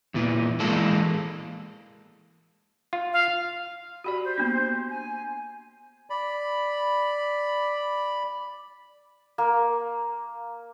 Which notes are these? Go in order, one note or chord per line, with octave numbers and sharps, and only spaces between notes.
E2 A#2 E3
E3 G#3 A#3 A4
F4
F5
F#4 G4 D5 B5
C5
A#3 B3 D4
G#5
D5 B5
A#3